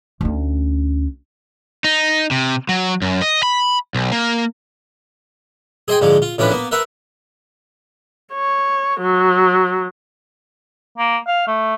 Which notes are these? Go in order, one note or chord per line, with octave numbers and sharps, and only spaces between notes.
D2 C#4
D#4
C3
F#3
F#2
D#5
B5
B1
A#3
G#4 C5 D#5 G5 G#5
G#2 D3 F3 G#3
F4
A2 F3 C#4 D4 B4
A#3 B3
A#4 B4 E5 F#5
C#5
F#3
A#3
F5
A3